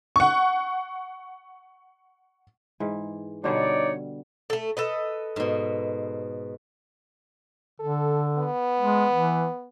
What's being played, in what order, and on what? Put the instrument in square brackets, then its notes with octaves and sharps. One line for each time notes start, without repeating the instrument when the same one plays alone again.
[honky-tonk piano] F#5 C#6
[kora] G#2 E3
[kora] B2 D3 G3 [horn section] D#4 C#5 D5
[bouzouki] A3 A4
A4 B4 D#5
[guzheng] G#2 B2
[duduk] D3 [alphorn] A4
[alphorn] B3
[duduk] G#3
E3